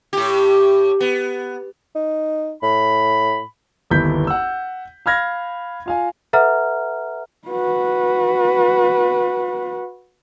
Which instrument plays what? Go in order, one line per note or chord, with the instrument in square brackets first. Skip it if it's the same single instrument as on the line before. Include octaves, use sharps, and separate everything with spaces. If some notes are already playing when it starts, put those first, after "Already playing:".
[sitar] A2 G4
B3
[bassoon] D#4
[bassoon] A2 [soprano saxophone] B5
[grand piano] G1 D#2 B3 E4 G6 B6
F#5 E6
F5 B5 F6 G#6 A#6
F4 F5 G#5
[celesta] A4 B4 E5 F#5 A#5 F6
[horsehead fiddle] F#4 B4